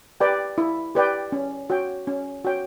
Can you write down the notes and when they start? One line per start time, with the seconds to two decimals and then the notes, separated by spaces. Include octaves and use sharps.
0.20 G4 B4 D5 G5
0.58 E4
0.95 G4 B4 D5 G5
1.32 C#4
1.70 F#4 C#5 G5
2.07 C#4
2.45 F#4 C#5 G5